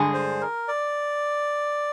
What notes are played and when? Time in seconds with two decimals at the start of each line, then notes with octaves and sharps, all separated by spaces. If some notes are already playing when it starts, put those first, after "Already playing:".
Already playing: G2 D3 G#3 D4 G#4
0.13 C5
0.41 A#4
0.68 D5